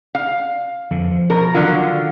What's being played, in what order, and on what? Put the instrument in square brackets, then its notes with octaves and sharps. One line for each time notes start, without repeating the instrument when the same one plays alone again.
[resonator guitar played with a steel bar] F5
[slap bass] F2 D3
F3
[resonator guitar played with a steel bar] B2 A#4
[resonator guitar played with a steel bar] D3 F#3 F4 [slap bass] D#3